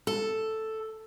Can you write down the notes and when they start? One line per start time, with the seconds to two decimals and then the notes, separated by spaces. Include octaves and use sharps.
0.07 A4